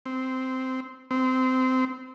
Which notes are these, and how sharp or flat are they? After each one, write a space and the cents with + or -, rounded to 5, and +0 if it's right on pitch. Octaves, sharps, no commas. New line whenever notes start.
C4 -10
C4 -20